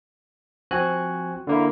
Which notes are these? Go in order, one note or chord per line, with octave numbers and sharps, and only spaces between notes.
F3 C4 F#4 G#5 F#6
D3 A#3 E4